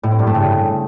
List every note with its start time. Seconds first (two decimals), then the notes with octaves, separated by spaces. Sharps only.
0.03 A2
0.11 C4
0.19 G2
0.27 A3
0.35 C#3